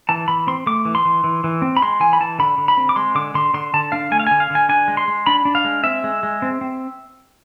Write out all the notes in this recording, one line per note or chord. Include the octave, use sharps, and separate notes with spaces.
E3 A5
E3 B5
C4 C6
A3 D6
E3
C6
E3
E3
E3
C4
B5
G#3 C6
E3 G#5
B5
E3 A5
D3 B5
D3
B5
C4
D6
G#3 C6
D3 D6
D3 C6
D3 C6
D3 A5
D4 F5
A3 G#5
F5
D3 G#5
F5
D3 G#5
D4 G#5
G#3
C6
G#3
D4 B5
D4
F5
G#3
C4 E5
G#3
G#3
C4
C4